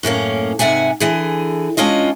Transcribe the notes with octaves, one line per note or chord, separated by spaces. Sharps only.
F#2 A2 A#3 C#4
G#2 C3 E5 F#5 G#5
D3 E3 G#4
G#3 C#4 D4 F4 D#5